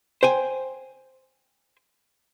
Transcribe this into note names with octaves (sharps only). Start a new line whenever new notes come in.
C5 G5 G#5